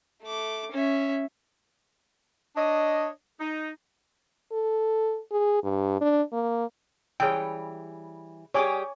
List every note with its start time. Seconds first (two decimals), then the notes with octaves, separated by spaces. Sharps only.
0.23 A3 D6
0.72 C#4 E5
2.56 D4 C#5 D#5
3.39 D#4
4.52 A4
5.32 G#4
5.64 G2
6.01 D4
6.32 A#3
7.20 E3 G3 G#4 C#5 G5
8.54 G3 G4 G#4 C#5 G#5 D6